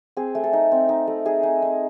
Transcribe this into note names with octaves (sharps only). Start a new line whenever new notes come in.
C4 G#4
A3
A4
D#4
C4
D#4
A3
D#4 G#4
D#4
D#4